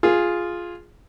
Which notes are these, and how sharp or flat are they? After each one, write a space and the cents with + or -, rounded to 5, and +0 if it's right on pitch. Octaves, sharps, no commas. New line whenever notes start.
F4 +0 G#4 +0